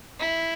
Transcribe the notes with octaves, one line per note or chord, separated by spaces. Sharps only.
E4